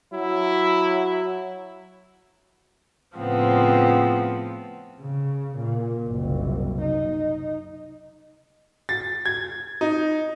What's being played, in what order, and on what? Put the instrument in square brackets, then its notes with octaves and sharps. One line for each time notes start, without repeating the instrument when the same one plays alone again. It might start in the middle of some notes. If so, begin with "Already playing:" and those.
[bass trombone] F#3 [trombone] E4
[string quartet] A2 C#3 F3 B3 C4
[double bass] C#3
A#2
F#1 C2
D#4
[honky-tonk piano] A6
G#6
D#4